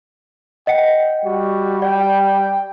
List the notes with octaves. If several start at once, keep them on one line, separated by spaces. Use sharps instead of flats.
D#5 F#5 G5 C#7
G3 F#4
D5 G5